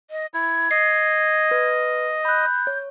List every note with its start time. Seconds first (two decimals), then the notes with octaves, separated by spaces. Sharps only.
0.11 D#5
0.34 E4 G#6
0.71 D#5 C7
1.51 B4
2.25 B5 F#6 G6
2.67 C#5